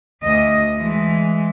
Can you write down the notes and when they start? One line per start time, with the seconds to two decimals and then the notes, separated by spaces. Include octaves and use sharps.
0.23 D2 D#5
0.79 E3 G#3